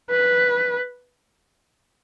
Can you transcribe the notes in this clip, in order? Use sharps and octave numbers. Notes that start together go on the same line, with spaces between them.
B4